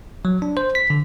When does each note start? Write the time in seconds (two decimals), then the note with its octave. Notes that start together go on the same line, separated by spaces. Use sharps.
0.25 F#3
0.42 D4
0.57 C5
0.75 B6
0.90 D3